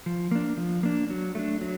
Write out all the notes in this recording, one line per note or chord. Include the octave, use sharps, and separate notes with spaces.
F3
A#3 D4
F3
A#3 D4
F#3
A3 D4
F#3